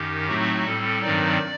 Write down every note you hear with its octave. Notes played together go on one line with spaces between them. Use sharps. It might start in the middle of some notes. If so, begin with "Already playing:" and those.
Already playing: F#2 D#3 D#4 G4
A2 F#3 A3 C4 D#4 F#4
A2 G3 C4 A4
G2 D#3 F#3 C4 D#4 D5